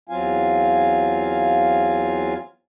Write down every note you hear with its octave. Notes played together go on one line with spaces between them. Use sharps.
E2 F#3 C4 F4 F5 G#5